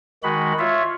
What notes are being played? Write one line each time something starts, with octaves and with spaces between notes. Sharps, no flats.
D#3 G#3 F#4 B5
F4 C#5 E5